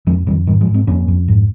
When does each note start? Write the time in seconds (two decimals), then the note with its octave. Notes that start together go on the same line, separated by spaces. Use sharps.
0.07 F2 F3 G#3
0.27 F2 D#3 G3
0.47 G#2 D#3 G3
0.61 F3 G#3
0.67 G#2
0.74 G#3 C4
0.87 F2 A#3 C#4
1.08 F2
1.28 G#2